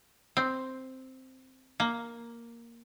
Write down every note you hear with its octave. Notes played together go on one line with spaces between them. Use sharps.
C4
A#3